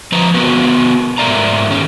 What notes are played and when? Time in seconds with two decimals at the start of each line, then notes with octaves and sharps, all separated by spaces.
0.12 F3 B4 A#5
0.34 B3 F#4 G#4 A#4 B4
1.18 G#2 A3 A#4 D5 A#5
1.70 D#3 C#4